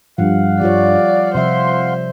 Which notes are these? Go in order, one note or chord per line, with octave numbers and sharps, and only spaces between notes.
G2 F3 F5 F#5
G3 F4 C#5 D5
C3 F3 C5 E5 C6